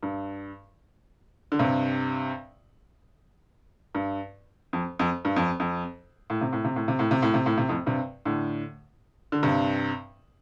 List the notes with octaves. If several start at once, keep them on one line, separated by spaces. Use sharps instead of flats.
G2
D3
G2 C3
G2
F2
F2
G2
F2
F2
A2
C3
A2
C3
A2
C3
A2
C3
A2
C3
A2
C3
F2 A2
G2 C3
A2 D3
D3
G2 C3